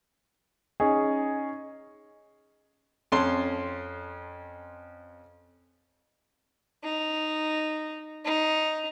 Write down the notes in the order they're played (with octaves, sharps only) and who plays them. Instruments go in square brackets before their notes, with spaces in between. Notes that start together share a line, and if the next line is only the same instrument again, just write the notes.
[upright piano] C#4 D#4 G#4
[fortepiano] F2 C#4 A5 C6
[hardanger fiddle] D#4
D#4